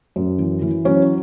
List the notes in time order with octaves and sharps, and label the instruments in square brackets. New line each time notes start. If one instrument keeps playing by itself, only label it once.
[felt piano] F#2
E3
E3
F#3 C#4